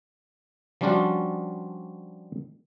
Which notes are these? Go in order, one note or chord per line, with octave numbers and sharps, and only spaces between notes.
F3 G3 C#4 D4 F4 F#4